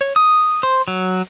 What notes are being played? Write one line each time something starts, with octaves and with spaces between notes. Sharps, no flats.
C#5
D#6
C5
F#3